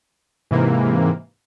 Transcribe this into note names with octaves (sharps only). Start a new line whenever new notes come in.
G#2 C3 E3 A#3